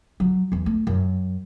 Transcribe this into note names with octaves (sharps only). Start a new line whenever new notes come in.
F#3
E2 E3
A3
F#2